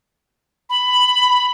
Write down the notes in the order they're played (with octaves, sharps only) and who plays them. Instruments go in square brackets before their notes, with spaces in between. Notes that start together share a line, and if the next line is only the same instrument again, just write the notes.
[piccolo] B5